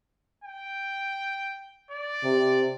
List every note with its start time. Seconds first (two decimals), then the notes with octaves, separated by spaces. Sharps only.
0.44 G5
1.91 D5
2.24 C3